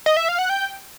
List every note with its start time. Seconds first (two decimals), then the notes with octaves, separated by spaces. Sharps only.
0.06 D#5
0.17 E5
0.29 F5
0.39 F#5
0.50 G5